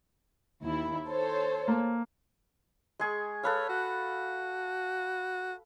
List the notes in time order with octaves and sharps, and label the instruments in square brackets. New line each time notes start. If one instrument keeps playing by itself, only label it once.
[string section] D#2 E4
A4 C5 C#5
[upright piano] A#3
[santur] G#3 G#4 C#6
[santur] A4 B4 F5 [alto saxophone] C#5
[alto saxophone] F#4